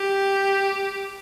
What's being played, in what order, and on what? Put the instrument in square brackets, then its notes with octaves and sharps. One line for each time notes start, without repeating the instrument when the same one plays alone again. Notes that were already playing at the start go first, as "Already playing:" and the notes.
Already playing: [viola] G4